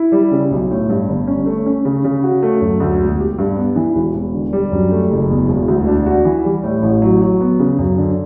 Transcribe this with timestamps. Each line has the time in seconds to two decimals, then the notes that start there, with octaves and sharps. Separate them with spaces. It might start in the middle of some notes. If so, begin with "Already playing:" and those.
Already playing: E4
0.12 G3
0.31 C#3
0.51 B1
0.70 A2
0.89 G2
1.09 G1
1.27 C#4
1.46 A3
1.66 C#4
1.85 C#3
2.04 C#3
2.23 F#4
2.43 A3
2.61 F#2
2.80 D2
3.00 E1
3.19 G4
3.38 G2
3.57 B3
3.76 E3
3.95 E1
4.15 E1
4.34 D3
4.53 G3
4.72 F#2
4.91 A3
5.11 F#1
5.30 E2
5.48 E1
5.68 D2
5.87 D4
6.06 F#4
6.25 E3
6.44 G3
6.63 A2
6.82 A1
7.02 F#3
7.22 F#3
7.41 B3
7.59 C#3
7.79 F#2
7.98 D3